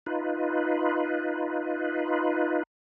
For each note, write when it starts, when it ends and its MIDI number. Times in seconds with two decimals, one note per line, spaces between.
0.06 2.63 63
0.06 2.63 65
0.06 2.63 71